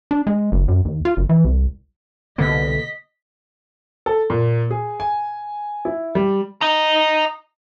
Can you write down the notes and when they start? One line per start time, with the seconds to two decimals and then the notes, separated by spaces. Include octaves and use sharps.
0.11 D4
0.27 G#3
0.52 F#1
0.68 F#2
0.85 D#2
1.05 F4
1.17 F#1
1.29 E3
1.45 C2
2.38 C2 B2 D3 A#3 D#5 B6
4.06 A4
4.30 A#2
4.71 G#4
5.00 G#5
5.85 E4
6.15 G3
6.61 D#5 A#5